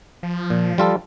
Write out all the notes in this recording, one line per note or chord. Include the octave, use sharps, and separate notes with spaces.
F3
A#2
G3 F4 A4